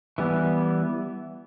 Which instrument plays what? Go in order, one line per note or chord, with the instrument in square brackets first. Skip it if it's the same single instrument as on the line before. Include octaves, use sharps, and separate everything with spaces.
[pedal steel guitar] E3 G3 B3